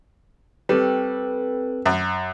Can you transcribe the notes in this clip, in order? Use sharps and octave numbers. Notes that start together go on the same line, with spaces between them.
G3 C4 A4 B4
F#2